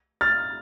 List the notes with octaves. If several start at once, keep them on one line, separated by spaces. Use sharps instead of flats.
F6 A6